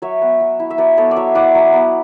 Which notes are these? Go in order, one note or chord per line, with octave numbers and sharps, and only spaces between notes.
F#3 C#5 E5
B3
F#3
E4
E5
F#3 B4 D5
B3 A4 C#5
D5
F#3 C#5 E5
E4 D5 F#5
F#3
B3